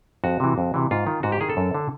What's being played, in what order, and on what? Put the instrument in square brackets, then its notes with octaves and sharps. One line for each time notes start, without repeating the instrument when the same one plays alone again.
[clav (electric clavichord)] F2 F#4
C3 E3
F2
C3 E3
G#2 F4
D#3
G#2 F#4
G4
D#3 G#4
A4
F#2
D3